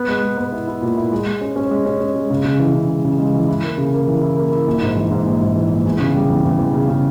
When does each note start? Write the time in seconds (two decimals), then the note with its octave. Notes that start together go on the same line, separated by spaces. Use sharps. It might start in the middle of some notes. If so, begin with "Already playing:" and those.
Already playing: B3
0.08 G#3
0.23 G#3
0.38 B3
0.52 E4
0.67 E4
0.82 A#2
0.97 E4
1.12 G#3
1.26 G#3
1.41 C#4
1.56 C#4
1.71 G#3
1.86 C#4
2.00 C#4
2.15 G#3
2.30 C#3
2.45 C#3
2.60 E3
2.75 C#3
2.89 G#3
3.05 C#3
3.19 G#3
3.34 E3
3.49 E4
3.63 A#3
3.78 C#3
3.93 A#3
4.07 E3
4.22 E4
4.38 A#3
4.52 E4
4.67 A#1
4.82 G#2
4.96 E3
5.11 G#2
5.26 A#1
5.41 G#2
5.55 E3
5.71 A#1
5.86 E2
6.00 C#3
6.15 G3
6.30 E2
6.45 E2
6.59 E2
6.74 C#3
6.88 C#3